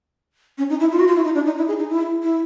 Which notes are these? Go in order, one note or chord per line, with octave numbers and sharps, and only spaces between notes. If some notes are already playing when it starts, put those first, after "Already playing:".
C#4
D#4
E4
F4
F#4
F4
E4
D#4
D4
D#4
E4
G#4
D#4
E4
E4